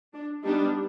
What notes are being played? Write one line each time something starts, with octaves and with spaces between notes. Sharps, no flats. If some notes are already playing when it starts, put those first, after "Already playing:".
D4
G3 B3 D4 D#4